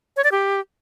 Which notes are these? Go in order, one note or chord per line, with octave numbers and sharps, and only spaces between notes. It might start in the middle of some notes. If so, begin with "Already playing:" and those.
C#5
D5
G4